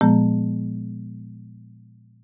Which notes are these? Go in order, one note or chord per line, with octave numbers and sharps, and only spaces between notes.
A#2 F3 G#3 B3